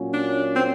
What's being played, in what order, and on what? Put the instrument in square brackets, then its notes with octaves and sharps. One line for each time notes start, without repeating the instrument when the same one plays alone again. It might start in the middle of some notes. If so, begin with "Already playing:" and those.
Already playing: [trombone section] A#2 F#3 A#3 C#4
[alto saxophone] D4
C4